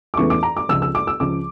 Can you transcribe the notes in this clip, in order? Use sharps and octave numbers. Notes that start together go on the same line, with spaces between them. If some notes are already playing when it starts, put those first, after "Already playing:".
D6
E2 C#3 E3 A3 C#4 C#6
D6
A#5
D6
C#2 C#3 F3 E6
E6
D6
E6
C#2 C#3 F3 D6